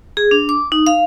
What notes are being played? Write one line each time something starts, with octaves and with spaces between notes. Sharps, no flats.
G#4
D4
D6
D#4
F5